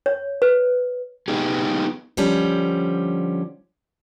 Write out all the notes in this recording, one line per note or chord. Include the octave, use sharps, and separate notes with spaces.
C#5
B4
B3 D#4 G4 G#4
D3 F3 G3 C#4